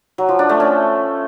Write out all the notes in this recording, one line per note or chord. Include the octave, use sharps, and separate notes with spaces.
F#3
F3
D4
A3
C#4